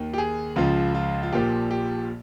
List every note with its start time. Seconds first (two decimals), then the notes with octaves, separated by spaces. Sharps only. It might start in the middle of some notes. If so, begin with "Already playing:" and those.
Already playing: D#2 D#3
0.13 G4
0.18 G#4
0.56 C#2 C#3 F3 F4
0.94 F4
1.23 F4
1.33 A#1 A#2 F3 G4
1.71 G4